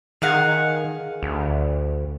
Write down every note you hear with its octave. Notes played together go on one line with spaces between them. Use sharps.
D#3 G#4 F5 F#5
D2